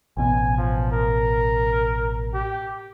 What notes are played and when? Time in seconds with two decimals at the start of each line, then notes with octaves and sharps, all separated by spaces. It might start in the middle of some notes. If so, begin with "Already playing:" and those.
0.17 A1 B2 G#5
0.58 F3
0.91 A#4
2.34 G4